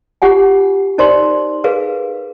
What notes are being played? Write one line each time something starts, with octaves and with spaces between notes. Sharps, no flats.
F4 G4 F#5 G#5
D#4 A#4 C5 D5 C6
G#4 A#4 B4 F5